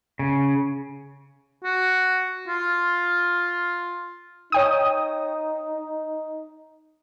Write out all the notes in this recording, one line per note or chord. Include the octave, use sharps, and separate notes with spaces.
C#3
F#4
F4
D#4 C#5 G5 D#6